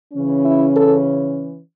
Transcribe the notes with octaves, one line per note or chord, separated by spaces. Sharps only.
C#3 E3 C#4
E4
A4